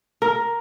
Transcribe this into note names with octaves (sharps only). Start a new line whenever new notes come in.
A#4